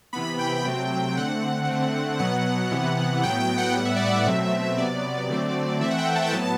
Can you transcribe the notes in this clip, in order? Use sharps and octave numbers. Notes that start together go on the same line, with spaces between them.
C3 E3 B3 B5
G5
C3 F#3 A3 C4
D3 A3 C4 F#5
D3 A3 C4
B2 F#3 B3 F#5
C3 E3 B3
A2 F#3 B3 G5
G5
F#5
A2 G3 B3 F#5
E5
D5
E5
B2 F#3 A3 C4
C3 F#3 B3 D5
D3 F#3 A3 C4
E3 A3 C4 E5
F#5
G5
A5
G5
A2 F#3 B3 A5